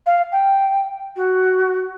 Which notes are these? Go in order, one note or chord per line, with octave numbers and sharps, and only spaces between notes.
F5
G5
F#4